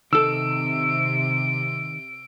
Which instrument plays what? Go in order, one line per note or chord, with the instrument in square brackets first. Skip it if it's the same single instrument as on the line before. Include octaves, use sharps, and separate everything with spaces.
[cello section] C3 [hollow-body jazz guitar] D#3 A4 [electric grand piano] E6 [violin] D7